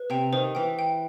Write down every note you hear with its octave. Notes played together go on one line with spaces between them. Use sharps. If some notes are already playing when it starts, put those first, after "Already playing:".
Already playing: B4
C3 G5
D#3 C5
E3 G5
G5